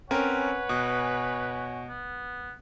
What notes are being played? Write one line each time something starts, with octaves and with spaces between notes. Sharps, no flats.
C4 C#4 A#4 B4 C#5 F#5 G#5
B2
B3